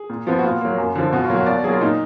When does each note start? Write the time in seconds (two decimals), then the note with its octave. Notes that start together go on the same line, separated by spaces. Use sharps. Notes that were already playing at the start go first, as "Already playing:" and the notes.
Already playing: G#4
0.10 A#2
0.27 F3 B3
0.39 F#4
0.44 A#2 F4
0.61 F#3 A#3
0.78 F#2
0.95 D3 F3
1.12 B2 F#4
1.24 F4
1.29 F#3 A#3
1.35 F#4
1.46 B2 D5
1.64 F#3 A#3 G#4
1.73 F4
1.81 A#2 D#4